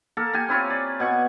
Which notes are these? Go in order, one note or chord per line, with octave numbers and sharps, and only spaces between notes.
A#3 A4 A#4
A#3 G4 G#5
C4 E4 F4 C#5
D5
B2 F#5 G#5 C#6